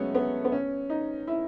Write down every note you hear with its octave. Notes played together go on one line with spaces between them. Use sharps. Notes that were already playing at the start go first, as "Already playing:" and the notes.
Already playing: F#3 G#3 A3 B3 C#4
B3
B3
C#4
D#4
E4